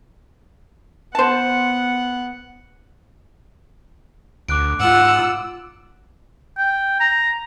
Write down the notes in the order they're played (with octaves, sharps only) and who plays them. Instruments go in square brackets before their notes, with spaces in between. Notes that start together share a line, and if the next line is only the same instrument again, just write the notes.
[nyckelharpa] B3 F#5 [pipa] C5 A5
[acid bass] D2 [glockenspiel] D6 F#6 D7
[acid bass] G#2 [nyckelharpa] F4 F#5 [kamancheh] E6
[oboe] G5
A#5